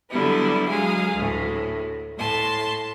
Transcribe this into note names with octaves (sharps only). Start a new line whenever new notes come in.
D3 F#3 G3 B3 E4
F#3 G#3 G#4 F5
D2 A2
A2 A5 C6